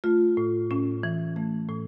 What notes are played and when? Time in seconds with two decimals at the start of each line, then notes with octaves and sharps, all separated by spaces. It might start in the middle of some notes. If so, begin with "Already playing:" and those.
0.04 A3 F4
0.37 A2
0.71 A2 C#4
1.03 E3
1.36 A3
1.69 A2